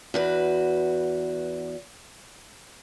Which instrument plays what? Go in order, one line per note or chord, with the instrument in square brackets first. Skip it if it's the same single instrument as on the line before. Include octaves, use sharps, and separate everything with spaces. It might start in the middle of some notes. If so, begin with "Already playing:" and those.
[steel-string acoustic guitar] E2 F#4 B4